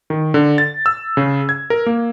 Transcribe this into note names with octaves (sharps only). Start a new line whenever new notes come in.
D#3
D3
A6
E6
C#3
G#6
A#4
A#3